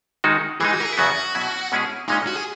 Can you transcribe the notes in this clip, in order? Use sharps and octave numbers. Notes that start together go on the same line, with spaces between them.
D#3 G#3 D#4 F#4
E3 G#3 D#4 G#4
F#4
A#4
G#4
E4
E2 C#3 F#3 B3 F#4
B2 F#3 C#4 E4
B2 G#3 C#4 E4 G#4
A#2 G#3 C#4 D#4
F#4
G#4